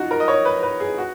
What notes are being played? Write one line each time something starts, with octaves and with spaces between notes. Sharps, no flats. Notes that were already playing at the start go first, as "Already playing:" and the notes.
Already playing: D#4 F4 F#4
A#4
D#5
C#5
B4
B4
G#4
F#4